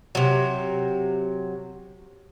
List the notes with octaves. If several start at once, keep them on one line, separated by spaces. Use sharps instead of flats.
C3 F#3